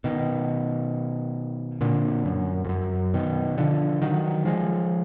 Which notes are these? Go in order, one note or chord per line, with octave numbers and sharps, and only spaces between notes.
B2 D#3
A#2 D3
F#2
F2
F#2
B2 D#3
D3 F3
D#3 F#3
F3 G#3